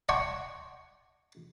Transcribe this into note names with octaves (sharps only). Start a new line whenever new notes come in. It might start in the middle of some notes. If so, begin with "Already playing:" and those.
D5 F#5 G5 A5 C6 C#6